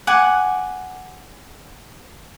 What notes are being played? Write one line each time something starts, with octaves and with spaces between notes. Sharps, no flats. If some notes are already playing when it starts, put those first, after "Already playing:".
F#5 G#5 D6